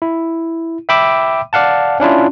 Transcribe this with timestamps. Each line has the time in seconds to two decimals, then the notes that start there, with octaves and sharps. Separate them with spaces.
0.02 E4
0.89 E5 G5 B5 D6 E6
1.53 D5 F5 F#5 A5
2.00 C#4 D4 E4 F4